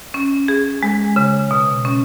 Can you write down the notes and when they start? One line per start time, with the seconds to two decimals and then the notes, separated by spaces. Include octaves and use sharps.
0.14 C#4
0.48 G#4
0.83 G#3
1.16 C#3
1.51 B2
1.85 C#4